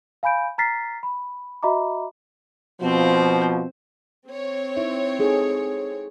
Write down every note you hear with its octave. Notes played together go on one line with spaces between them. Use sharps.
F5 G#5 B5 G6 D7
A#5 F6 A6 B6 C7
B5
F#4 D#5 E5 A#5 B5 D6
B2 F3 C4 C5
C4 C#5
D#4 E4 E5
D#4 G#4 A4